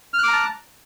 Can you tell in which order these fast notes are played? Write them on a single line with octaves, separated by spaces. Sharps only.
F6 F#6 D6 A#5 A5